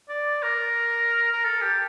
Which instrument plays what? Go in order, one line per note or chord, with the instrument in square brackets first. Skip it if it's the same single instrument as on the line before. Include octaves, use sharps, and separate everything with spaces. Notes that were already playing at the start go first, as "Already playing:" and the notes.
[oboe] D5
A#4
A#4
A4
G4